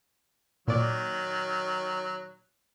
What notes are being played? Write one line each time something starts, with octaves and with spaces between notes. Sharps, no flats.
A#2 D#3 F#3 D5